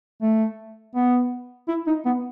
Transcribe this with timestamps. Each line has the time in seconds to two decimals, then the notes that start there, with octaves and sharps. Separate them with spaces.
0.22 A3
0.95 B3
1.68 E4
1.87 D#4
2.05 B3